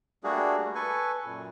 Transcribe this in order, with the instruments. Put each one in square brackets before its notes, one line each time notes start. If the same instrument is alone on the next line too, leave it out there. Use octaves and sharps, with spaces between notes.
[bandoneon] G3 A3 A#3 D4 F#4 G#4
A4 B4 G#5 C#6
F#2 A#2